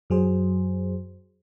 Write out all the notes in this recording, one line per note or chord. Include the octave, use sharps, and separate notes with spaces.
F#2 F#3 G#4 C5